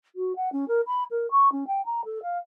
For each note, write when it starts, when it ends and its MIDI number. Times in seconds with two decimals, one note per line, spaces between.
0.15 0.35 66
0.35 0.51 78
0.52 0.67 61
0.68 0.81 70
0.87 1.03 83
1.10 1.29 70
1.31 1.51 85
1.52 1.64 61
1.67 1.84 79
1.85 2.04 82
2.05 2.22 69
2.22 2.37 77